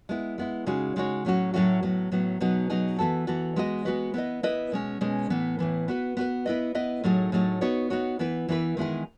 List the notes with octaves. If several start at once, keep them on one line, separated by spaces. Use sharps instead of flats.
G#3 B3 E4
G#3 B3 E4
C#3 G#3 D#4 F#4 C#5
C#3 G#3 D#4 F#4 C#5
A2 F#3 A3 C#4 F#4
A2 F#3 A3 C#4 F#4
A2 F#3 B3
A2 F#3 B3
B2 F#3 B3 D#4 G#4
B2 F#3 B3 D#4 G#4
E3 B3 F#4 A4
E3 B3 F#4 A4
G#3 B3 F#4 B4 D#5
G#3 B3 F#4 B4 D#5
B3 E4 B4 D#5
B3 E4 B4 D#5
B2 G#3 C#4
B2 G#3 C#4
A2 E3 B3
A2 E3 B3
B3 F#4 B4
B3 F#4 B4
B3 E4 B4 D#5
B3 E4 B4 D#5
A2 F#3 A3 D#4 G#4
A2 F#3 A3 D#4 G#4
B3 D#4 F#4 C#5
B3 D#4 F#4 C#5
E3 B3 E4 B4
E3 B3 E4 B4
D#3 G#3 B3 E4 G#4